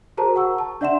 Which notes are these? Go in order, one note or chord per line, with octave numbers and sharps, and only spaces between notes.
F#4 G#4 A#4 C5 A5 A#5
F#5 C#6 E6
A5
D4 D5 E5 F#5 C6 E7